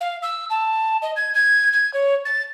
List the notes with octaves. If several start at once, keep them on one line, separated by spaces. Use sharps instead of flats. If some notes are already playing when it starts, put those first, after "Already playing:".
F5
E6
A5
D#5
G#6
G#6
G#6
C#5
A6